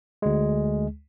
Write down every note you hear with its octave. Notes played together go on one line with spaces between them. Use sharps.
D2 G#3